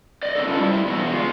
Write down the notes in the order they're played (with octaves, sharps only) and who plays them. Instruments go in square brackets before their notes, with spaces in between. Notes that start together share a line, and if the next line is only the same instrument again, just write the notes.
[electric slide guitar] D5 D#5
B3 C4 D#4 A4
C#4 F4 A4 B4 D5
G3 E4
E2 B2 F#4
G#3 F4